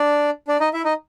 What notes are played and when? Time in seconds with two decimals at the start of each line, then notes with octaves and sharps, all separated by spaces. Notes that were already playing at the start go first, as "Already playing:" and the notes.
Already playing: D4 D5
0.48 D4 D5
0.60 D#4 D#5
0.73 E4 E5
0.85 D#4 D#5